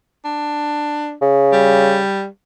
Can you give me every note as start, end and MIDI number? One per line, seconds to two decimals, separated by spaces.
0.25 1.15 62
1.22 2.01 49
1.53 2.27 55